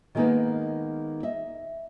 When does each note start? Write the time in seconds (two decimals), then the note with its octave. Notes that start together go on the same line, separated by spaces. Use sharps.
0.15 D#3 G3 G#3 A#3 B3 D#4
1.23 D#5 E5